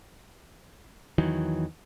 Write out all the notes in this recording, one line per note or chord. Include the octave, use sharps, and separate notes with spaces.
E2 D#3 E3 F#3